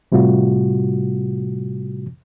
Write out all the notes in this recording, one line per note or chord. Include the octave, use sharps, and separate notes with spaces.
A2 C3 G3 A3 F4 F#4